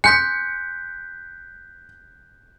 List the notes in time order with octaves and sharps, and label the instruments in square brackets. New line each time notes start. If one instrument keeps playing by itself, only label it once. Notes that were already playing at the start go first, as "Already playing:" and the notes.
[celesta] G#5 C6 D#6 [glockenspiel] F#6 G6 B6 [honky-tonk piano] C#7